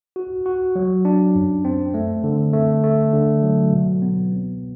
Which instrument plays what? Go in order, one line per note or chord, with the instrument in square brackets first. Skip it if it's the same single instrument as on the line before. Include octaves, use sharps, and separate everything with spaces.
[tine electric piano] F#4
F#4
F#3
D4
F#2
C4
A3
D3
A3
A3
D3
F#3
B2
B3
C4